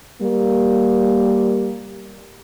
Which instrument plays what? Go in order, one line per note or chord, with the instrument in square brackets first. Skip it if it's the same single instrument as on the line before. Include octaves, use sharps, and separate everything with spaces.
[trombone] G3 [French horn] A#3